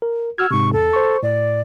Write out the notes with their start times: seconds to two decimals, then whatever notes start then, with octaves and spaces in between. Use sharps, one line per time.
0.02 A#4
0.38 F#4 E6 F6 G#6
0.51 G#2 C3 C#6
0.73 E2 A4
0.93 C5 C#6
1.23 A2 D5